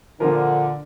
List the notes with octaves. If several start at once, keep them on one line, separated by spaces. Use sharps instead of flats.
A#2 D3 F3 A#3 F4 A#4